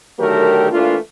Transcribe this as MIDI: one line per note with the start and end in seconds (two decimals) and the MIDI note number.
0.19 0.67 50
0.19 0.67 51
0.19 0.67 54
0.19 0.67 57
0.19 0.67 67
0.19 0.67 70
0.71 0.96 52
0.71 0.96 57
0.71 0.96 58
0.71 0.96 62
0.71 0.96 65